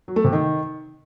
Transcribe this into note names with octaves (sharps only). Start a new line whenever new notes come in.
F#3
A3
C3
D#3